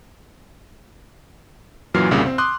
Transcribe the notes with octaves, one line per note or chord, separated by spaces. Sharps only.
F#2 A#2 E3 F#3 F6 C7
C2 G2 A#2 C#3
C4
C6 D6 D#6 F#6